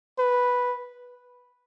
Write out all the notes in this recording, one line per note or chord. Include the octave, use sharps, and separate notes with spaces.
B4